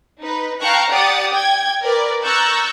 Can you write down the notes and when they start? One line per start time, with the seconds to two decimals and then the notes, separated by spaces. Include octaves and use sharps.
0.22 D#4 B4
0.60 F5 G5 A5 A#5 C#6 F#6
0.91 G4 D5 F#5 D#6 A6
1.33 G5 G#6
1.82 A#4 B4 D5
2.24 A#5 C#6 E6 F#6 G6 A6